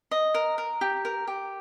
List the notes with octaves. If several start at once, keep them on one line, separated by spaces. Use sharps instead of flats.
D#5
A#4
A#4
G4
A#4
G4